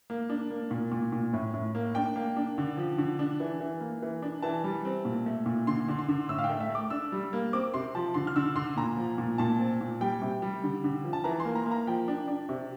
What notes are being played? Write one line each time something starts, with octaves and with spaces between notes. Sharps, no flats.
A#3
D4
A#3
A#2
A#2
A#2
A2
A2
A#3
D4 G5
A#3
D4
D3
F3
D3
D4
E3
E3
A#3
E3
D4
E3 A5
G3
C4
A#2
A3
A#2
D3 C6
D3
C6
D3
A2 E6
F5
G5
A3
E5
A3
D6
D4 E6
G3
A#3
C4 D6
C3 C6
F3 A5
D3 C6
F6
D3 E6
D3 C6
A#2 A#5
F3
A#2
A#2 A5
C4
A#2
G3 G5
C3
G3
D3
D3
F3
A5
E3 A#5
C6
A#3
A#5
A#3
A#5
F3 G5
D4
D4
C3